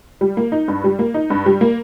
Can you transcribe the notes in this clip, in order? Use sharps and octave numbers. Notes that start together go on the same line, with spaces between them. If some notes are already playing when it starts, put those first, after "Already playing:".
G3
A#3
D#4
G2
G3
A#3
D#4
G2
G3
A#3